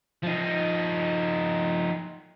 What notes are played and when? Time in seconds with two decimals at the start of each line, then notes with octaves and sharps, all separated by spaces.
0.23 F3 D#4